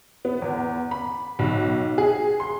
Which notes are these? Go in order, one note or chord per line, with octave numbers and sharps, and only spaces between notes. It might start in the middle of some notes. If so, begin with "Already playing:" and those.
B3
E2
B5
B1
G#4
C6